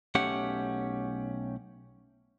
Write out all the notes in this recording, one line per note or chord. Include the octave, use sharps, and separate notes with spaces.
B1 A3 C#4 G4 F#5